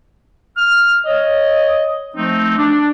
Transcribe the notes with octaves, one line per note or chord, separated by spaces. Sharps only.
F6
C#5 D#5
F3 A3 C4 D#4
D4